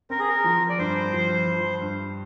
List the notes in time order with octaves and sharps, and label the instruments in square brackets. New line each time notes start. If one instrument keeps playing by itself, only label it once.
[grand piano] C4 [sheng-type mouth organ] A#4
[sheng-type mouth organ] G#4
A#4
[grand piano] F3
[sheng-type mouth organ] D5
[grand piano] G2 [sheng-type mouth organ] C5
[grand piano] F3
F3
G2